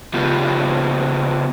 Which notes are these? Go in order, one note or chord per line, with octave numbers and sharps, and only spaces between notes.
C#3 B3 F4 G4